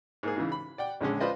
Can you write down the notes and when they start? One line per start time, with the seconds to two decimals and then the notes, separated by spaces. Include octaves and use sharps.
0.23 G#2 A#3 G#4
0.36 G#2 C#3 E3
0.52 B5
0.78 D5 F#5 G5
1.01 A#1 D3 G#3 C#4
1.20 F4 B4 C5 D5 D#5